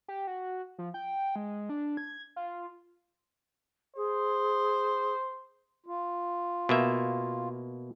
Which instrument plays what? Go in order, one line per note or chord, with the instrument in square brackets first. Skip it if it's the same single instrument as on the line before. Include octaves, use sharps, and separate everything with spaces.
[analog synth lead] G4
F#4
F3
G5
G#3
D4
G#6
F4
[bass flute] G#4 [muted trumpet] C5
[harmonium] F4
[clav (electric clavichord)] B2 A#3 E5